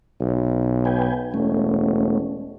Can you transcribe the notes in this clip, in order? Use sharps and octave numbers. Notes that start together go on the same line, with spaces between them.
B1
B4 G5 G#5
E1 A3 C#4